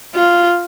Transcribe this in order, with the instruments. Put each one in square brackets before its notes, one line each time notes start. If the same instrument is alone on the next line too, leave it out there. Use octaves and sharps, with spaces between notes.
[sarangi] F4